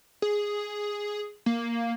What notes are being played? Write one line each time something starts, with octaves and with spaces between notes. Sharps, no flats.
G#4
A#3